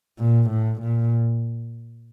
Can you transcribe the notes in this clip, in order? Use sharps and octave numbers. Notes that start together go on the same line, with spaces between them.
A#2
A2
A#2